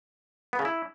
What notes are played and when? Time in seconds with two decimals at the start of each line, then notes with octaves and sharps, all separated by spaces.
0.53 B3
0.59 C#3
0.65 E4